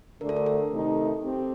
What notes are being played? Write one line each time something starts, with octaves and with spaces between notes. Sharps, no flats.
D2 D3 A3 D4 A#4
A4
A#4
A4
C3 D#3 A3 D#4
C4 G4